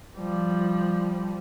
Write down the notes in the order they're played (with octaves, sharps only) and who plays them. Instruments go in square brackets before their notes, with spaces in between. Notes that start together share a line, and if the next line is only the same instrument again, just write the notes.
[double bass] F3 G3